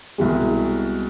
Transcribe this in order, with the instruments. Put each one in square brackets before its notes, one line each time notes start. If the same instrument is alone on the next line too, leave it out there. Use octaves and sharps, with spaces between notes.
[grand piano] C2 B2 G#3